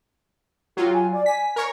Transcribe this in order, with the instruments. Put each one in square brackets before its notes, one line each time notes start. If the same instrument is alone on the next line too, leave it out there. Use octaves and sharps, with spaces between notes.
[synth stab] F#3 F4 [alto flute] G4
[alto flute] G#5
D5
[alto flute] G#5 [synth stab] B6
[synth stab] A#4 C#5